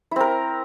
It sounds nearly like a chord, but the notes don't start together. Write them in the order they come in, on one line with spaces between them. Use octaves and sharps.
E4 C4 A#4